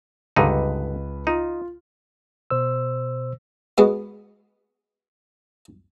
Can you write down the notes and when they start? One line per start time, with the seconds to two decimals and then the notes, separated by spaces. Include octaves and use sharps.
0.36 C#2 G2 D3 D#4 B4
1.27 D#4 F4
2.50 B2 C5 E6
3.78 G#3 B3 F#4